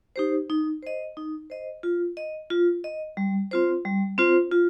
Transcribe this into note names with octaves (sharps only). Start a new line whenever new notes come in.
D#4 G4 C5
D#4
C5 D#5
D#4
C5 D#5
F4
D#5
F4
D#5
G3
C4 F4 C5
G3
C4 F4 C5
F4